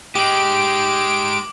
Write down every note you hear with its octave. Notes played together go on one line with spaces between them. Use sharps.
G#3 D#4 G4 D6 D7 F#7